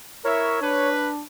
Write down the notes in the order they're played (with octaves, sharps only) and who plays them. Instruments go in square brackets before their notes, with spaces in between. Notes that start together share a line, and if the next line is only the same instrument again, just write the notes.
[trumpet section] E4 E5 [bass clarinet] A#4 [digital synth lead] C#5
[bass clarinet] D4 [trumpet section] B4